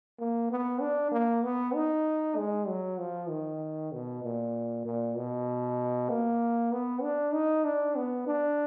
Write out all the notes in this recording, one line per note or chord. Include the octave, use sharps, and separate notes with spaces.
A#3
B3
D4
A#3
B3
D#4
G#3
F#3
F3
D#3
B2
A#2
A#2
B2
A#3
B3
D4
D#4
D4
B3
D4